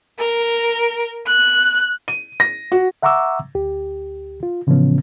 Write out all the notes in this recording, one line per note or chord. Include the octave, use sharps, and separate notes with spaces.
A#4
F#6
D#7
A#6
F#4
E5 F#5 A#5 C#6 D6 E6
D2 G4
F4
A2 C#3 E3 F3 B3 C#4